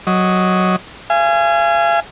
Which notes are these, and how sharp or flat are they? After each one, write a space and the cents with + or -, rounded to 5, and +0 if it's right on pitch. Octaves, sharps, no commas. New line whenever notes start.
F#3 +0 D#5 +0
F5 -40 G#5 +0